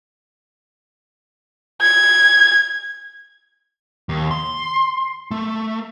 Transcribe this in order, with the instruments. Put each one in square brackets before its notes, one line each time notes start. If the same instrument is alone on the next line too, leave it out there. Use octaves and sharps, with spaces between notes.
[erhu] G#6
[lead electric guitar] D#2
C6
A3